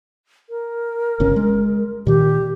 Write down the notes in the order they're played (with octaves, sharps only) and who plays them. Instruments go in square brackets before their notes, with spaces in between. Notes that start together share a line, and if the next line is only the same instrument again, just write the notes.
[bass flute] A#4
[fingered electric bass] G1 C#3 C#4
G#3
[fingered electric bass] A#2 D#3 [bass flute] G4